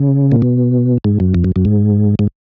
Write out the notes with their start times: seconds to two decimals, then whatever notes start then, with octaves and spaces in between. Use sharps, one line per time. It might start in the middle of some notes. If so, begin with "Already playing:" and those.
Already playing: C#3
0.32 A#2
0.42 B2
1.04 G#2
1.20 F#2
1.35 F2
1.44 F#2
1.56 F#2
1.65 G#2
2.19 G#2